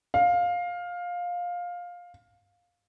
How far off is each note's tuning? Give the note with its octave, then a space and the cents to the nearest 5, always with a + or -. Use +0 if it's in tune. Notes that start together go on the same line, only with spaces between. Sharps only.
F5 +15